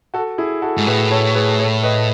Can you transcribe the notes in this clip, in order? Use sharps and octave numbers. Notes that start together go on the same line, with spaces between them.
F#4 A4
E4 G#4
F#4 A4
G#2
A2 G#4 B4
A4 C#5
G#4 B4
A4 C#5
B4 D#5